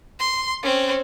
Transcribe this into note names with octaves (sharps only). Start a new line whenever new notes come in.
C6
C4 C#4